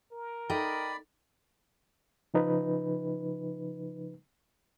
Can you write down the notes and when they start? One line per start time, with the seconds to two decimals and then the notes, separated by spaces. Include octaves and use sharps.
0.12 A#4
0.50 D#4 A4 D5 D#5 G5 B5
2.34 C#3 F3 D#4 B4